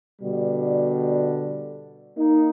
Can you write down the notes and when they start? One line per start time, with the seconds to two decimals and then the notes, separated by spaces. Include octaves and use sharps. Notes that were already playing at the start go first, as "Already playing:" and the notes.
0.21 B2 D3 G3
2.16 A#3 D#4